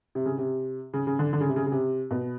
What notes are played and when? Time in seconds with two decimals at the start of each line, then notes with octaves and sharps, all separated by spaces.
0.15 C3
0.26 C#3
0.38 C3
0.93 C#3
1.07 C#3
1.19 D3
1.33 D3
1.41 C#3
1.48 C3
1.56 C#3
1.66 C#3
1.72 C3
2.11 B2